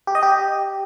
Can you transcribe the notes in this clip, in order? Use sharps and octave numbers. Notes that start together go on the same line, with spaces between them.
G4
D#5
G4